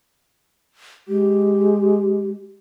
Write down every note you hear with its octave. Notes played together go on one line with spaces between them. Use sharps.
G#3 G4